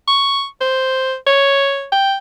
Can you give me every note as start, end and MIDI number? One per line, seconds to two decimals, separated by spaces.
0.08 0.46 85
0.61 1.15 72
1.27 1.87 73
1.92 2.15 79